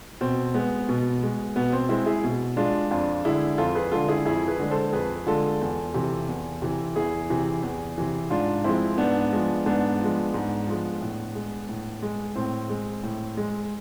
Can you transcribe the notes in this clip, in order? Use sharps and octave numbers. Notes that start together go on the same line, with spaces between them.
B2 C4
G#3 B3
B2
G#3
B2 B3
C4
G#3 C4 E4
E4 G#4
B2
G#3 D4 F4
F2 D4 F4
D3 G#3 E4 G#4
F2 F4 A4
G#4 B4
D3 G#3 F4 A4
E4 G#4
F2 E4 G#4
G#4 B4
D3 G#3
A4 C5
F2 G#4 B4
D3 G#3 F4 A4
E2
C3 E3
E2
C3 E3
E2 E4 G#4
C3 E3
E2
C3 E3
G#2 D4 F4
F3 G#3 C4 E4
G#2 B3 D4
F3 G#3
G#2 B3 D4
F3 G#3
G#2
F3 G#3
A2
G#3
A2
G#3
A2 C4
G#3
A2
G#3